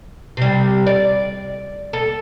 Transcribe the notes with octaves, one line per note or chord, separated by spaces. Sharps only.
C3 G3
D5
A4